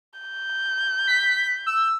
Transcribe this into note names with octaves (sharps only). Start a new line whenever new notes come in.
G6
B6
E6